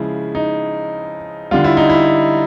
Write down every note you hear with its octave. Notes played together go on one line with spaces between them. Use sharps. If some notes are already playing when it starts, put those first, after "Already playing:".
Already playing: C#3 F3 G#3 E4
D#4
D3 G3 F4
E4
D#4
E4